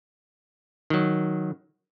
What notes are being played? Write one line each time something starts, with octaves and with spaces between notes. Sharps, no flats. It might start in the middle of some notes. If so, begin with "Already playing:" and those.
D#3 F#3